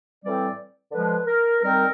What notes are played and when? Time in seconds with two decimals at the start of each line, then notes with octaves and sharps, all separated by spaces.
0.23 A2 E3 G3 C4 D5
0.92 D3 F3 G#3 B4
1.26 A#4
1.61 D#3 G3 C4 A#4